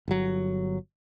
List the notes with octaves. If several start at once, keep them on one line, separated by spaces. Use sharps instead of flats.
G1 F#3